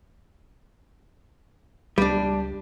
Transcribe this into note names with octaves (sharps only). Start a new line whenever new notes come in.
C#2 G3 D4